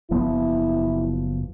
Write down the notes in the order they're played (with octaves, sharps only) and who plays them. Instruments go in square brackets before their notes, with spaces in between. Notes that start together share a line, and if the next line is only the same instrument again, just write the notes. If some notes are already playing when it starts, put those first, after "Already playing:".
[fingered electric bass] F#1 F3 B3 [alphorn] E4